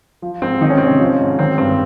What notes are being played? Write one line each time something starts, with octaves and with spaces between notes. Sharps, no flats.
F3
G#2 C4
D#3 D#4
C#4
C3 C4
C#4
F3
G#2
D#3 C4
G2 C4